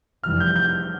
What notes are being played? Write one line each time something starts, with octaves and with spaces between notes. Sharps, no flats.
F1 F2 E3 G3 F6
G6
G6